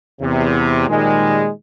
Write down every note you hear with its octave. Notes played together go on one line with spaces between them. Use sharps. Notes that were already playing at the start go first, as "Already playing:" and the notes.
E2 C3
A#2 D#3 F3 G3 G#3